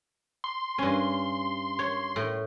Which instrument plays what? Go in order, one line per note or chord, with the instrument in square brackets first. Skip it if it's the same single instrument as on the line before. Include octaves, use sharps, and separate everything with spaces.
[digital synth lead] C6
[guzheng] G2 C#4
C#5
A2